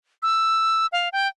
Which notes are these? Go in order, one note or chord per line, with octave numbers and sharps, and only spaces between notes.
E6
F5
G5